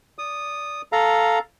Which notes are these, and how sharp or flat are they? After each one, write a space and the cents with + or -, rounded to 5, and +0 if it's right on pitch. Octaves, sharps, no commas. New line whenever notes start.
D5 -20 D#6 -10
A4 +0 F5 +0 A#5 +0